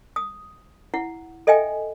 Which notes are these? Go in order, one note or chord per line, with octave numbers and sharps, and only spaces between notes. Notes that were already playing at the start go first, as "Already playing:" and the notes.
D#6
E4 F#5
A4 D#5 E5 G5 G#5